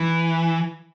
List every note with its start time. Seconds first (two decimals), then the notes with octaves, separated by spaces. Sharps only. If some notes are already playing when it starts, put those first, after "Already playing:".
Already playing: E3